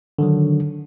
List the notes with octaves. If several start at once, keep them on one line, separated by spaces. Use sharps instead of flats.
D3 D#3 F#3